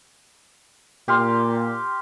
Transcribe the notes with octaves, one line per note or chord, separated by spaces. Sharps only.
A#2 G4 F5 C6